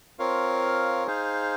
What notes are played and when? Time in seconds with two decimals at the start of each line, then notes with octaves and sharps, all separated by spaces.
0.19 C4 F4 A#4 C#5 F5
1.06 D#4 G#4 C5 F5